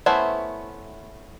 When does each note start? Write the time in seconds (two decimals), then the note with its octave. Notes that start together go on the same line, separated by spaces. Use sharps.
0.06 A3 B3 C#4 E4 C5